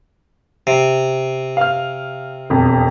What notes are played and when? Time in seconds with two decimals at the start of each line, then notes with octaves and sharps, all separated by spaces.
0.67 C3
1.57 F5 F6
2.50 E1 F2